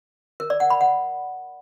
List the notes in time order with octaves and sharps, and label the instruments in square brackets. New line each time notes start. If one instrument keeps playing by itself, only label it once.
[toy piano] A#4
D5
F#5
B5
F#5